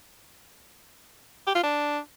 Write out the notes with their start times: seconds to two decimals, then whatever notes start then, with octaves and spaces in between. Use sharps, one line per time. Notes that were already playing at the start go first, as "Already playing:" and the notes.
1.47 G4
1.55 F4
1.64 D4